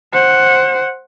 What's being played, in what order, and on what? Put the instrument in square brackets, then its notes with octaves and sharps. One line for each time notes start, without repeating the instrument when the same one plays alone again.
[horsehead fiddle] C5 F#5